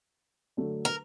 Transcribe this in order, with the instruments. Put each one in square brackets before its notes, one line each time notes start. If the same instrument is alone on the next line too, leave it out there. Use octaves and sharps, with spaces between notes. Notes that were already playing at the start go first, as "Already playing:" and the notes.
[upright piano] D3 F#3 A3 D4
[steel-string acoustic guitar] A#4